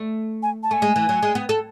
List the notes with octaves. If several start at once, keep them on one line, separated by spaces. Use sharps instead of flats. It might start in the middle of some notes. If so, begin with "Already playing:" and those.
Already playing: A3
G#5
A5
A3 G#5
G#3
E3
F#3
G#3
B3
A4